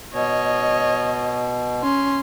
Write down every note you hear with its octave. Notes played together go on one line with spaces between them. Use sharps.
B2 C#5 D#5
C#4 C6